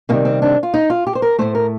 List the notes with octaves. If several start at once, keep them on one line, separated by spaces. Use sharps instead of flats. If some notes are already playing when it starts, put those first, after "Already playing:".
C3 D#3 G3 A#3
C4
D4
F4
D#4
F4
G4
C5
A#4
A2 A3 C5
A#4